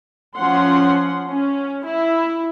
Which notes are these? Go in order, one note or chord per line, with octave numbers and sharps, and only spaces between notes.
F3 C#4 F#5 C6
C#4
E4